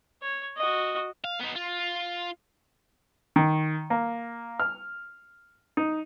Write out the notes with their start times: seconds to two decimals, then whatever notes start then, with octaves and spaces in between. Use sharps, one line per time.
0.22 C#5
0.57 F#4 D#5
1.25 F5
1.40 B3 D#4
1.56 F4
3.36 D#3
3.90 A#3
4.60 F6
5.77 D#4